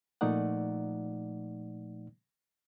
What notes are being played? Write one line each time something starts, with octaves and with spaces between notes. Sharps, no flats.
A#2 F3 A3 D#4 D5 F#5